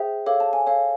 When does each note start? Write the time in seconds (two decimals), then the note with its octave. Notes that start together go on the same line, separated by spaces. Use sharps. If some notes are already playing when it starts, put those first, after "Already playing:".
Already playing: G#4 C5 E5 G5
0.26 A4 C#5 F5 D6
0.40 A5
0.53 G#5
0.67 A4 C#5 F5